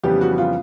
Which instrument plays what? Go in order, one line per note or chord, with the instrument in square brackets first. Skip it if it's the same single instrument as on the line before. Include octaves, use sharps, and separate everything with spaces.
[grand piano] F2 C#3 E3 G3 B3 [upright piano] G4
[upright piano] F#4
F4